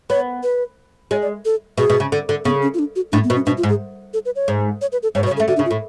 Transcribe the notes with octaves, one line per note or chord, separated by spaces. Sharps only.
B3 C#5
B4
G#3 C#5
D5
A4
B2 G#4
B2
C#3
D3
D3
C#3 B3
C#4
F4
D4
F#4
A2 D4
B3
B2
C#4
B2 D4
F4
G#2
G#4
A4
B4
C#5
G#2
C#5
B4
A4
G#2 C#5
B2
C#5
C#3
A4
A3
D3 F#4
C#3 D4
F4
A2